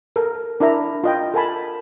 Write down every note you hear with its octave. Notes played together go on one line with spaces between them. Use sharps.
A4 A#4
D4 E4 A#4 E5 A#5
F4 D#5 G5
A4 A#4 F#5 G#5 A5 B5